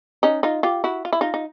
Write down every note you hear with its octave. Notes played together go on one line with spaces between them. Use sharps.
C#4 D#4
D#4 F4
F4 G4
E4 F#4
F4
E4
D#4 F4
D#4